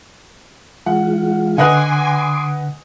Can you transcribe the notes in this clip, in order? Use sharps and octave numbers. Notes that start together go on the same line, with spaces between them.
E3 G#3 F4 F#5
D3 B4 D#5 F#5 G#5 C6 D6 F#6